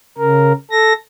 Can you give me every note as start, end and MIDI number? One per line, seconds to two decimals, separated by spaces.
0.18 0.53 49
0.18 0.53 70
0.71 0.93 69
0.71 0.93 94